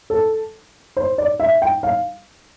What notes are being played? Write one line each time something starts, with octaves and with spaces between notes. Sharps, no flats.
A4
C5
D5
E5
G5
F5